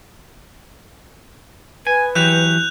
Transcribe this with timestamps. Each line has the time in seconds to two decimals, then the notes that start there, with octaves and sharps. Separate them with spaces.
1.87 B4 G#5
2.15 E3 F#3 G4 F#6 G6 F7